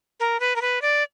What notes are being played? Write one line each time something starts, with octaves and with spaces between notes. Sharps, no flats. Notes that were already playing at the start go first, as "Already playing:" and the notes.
A#4
B4
A#4
B4
D5